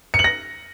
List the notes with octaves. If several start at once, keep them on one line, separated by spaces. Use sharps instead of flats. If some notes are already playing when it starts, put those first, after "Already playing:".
C#7
F#7
A#6